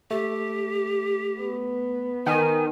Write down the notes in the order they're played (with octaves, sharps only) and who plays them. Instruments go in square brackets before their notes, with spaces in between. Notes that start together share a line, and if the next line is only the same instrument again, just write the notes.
[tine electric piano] A3 [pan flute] G4
[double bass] B3
[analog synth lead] D#3 [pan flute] G#5